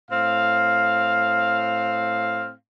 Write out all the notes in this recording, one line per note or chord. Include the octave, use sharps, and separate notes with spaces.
A2 C4 F5